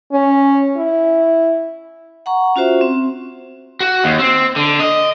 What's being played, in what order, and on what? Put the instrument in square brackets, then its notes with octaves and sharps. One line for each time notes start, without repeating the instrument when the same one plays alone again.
[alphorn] C#4
E4
[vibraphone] F#5 A#5 C#6
C#4 F4 F#4 C5 E5
C4
[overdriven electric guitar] F#4
D#2
C4
D3
D#5